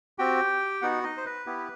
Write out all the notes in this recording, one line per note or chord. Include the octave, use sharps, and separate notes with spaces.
C4 F#4 G4 G5
B3 D#4 F#4 F#5
D#4 D#5
C5
B4
B3 E4 G4